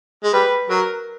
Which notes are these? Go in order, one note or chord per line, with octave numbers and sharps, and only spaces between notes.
G#3
G3 B4
F#3 A#4